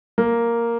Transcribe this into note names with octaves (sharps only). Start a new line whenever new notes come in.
A#3